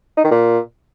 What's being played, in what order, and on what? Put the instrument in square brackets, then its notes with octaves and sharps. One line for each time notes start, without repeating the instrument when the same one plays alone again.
[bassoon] D#4
D#3
A#2